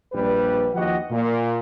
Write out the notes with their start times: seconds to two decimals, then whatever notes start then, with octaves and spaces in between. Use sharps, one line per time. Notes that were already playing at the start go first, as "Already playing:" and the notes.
0.13 A#1 G3 B4
0.75 D#2 F3 F#4 G4 D#5 F#5
1.10 A#2